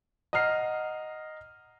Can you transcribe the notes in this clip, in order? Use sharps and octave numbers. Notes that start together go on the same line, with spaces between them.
D#5 F#5 A#5 F6 C7